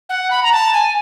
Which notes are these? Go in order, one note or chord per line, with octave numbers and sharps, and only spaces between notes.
F#5
B5
A#5
A5
G#5